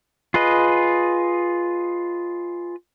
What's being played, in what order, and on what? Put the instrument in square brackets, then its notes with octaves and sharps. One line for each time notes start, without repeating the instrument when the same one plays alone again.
[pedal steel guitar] F4 G#4 B4 D#5